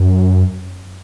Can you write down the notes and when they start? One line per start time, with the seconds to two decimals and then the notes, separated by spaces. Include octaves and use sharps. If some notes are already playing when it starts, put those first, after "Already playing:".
Already playing: F#2